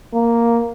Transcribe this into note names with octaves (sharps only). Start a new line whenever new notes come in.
A#3